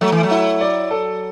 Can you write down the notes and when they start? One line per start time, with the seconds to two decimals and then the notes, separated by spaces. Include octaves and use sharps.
0.01 F#3 A3
0.12 E3
0.23 F#3
0.31 E4
0.61 D5
0.91 A4